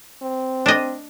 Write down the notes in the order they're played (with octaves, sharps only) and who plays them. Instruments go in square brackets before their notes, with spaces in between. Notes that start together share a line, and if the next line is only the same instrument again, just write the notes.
[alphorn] C4
[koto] D4 D#5